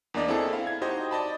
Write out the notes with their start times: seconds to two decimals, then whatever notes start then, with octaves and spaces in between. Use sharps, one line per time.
0.14 E2 A#3 D4 D5 D#5
0.28 C4 E4 G#4 A4
0.52 E4 F5
0.67 G#6
0.81 D#4 F#4 G4 C5 D#5
1.11 D5 D#5 A5 B5